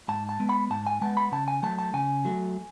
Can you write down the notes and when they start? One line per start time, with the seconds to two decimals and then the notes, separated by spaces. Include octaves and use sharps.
0.08 G#2 A5
0.29 A5
0.40 G#3 B3
0.49 B5
0.70 G#2 A5
0.87 G#5
1.01 G#3 B3 A5
1.17 B5
1.32 C#3 A5
1.48 G#5
1.63 F#3 A3 A5
1.79 A5
1.94 C#3 G#5
2.25 F#3 A3